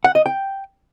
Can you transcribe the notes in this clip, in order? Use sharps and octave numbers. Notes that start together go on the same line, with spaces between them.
F#5
D#5
G5